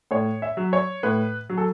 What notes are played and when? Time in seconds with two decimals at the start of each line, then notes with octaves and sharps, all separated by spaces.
0.11 A2 C#5
0.42 E5
0.57 F#3
0.73 C#5
1.03 A2 B4
1.50 F#3
1.58 A4